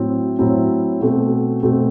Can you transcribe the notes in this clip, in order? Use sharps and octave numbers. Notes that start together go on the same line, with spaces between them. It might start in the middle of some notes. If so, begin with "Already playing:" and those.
Already playing: A2 F#3 C4 E4
A2 F#3 C4 E4
B2 A3 C4
B2 A3 C4